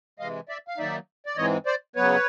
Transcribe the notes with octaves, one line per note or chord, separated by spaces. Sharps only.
C3 E3 G#3 D#5 F5
D5 E5
F5
D#3 F#3 A#3 D#4 D5 E5
D5
G#2 E3 G#3 C4 C#5 D#5
C5 D5
C#3 F#3 B3 B4 C#5